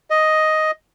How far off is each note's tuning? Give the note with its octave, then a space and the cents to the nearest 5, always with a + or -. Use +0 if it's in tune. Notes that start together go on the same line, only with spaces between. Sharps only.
D#5 +5